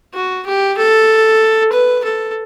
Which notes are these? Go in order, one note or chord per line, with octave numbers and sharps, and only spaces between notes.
F#4
G4
A4
B4
A4